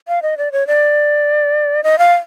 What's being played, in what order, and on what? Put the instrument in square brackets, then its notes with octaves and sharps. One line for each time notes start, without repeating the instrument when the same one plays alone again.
[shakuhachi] F5
D#5
D5
C#5
D5
D#5
F5